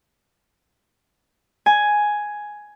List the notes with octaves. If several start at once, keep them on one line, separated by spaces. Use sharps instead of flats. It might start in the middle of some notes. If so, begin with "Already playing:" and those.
G#5